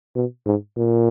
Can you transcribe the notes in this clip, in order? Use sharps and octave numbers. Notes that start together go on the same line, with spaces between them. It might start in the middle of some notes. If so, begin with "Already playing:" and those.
B2
G#2
A#2